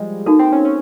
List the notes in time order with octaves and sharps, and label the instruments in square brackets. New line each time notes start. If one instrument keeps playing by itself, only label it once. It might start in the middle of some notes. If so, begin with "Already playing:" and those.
Already playing: [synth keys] F3 G3 G#3
[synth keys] A#3 [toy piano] D#4 F#4 A4
[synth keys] C4
C#4
C#4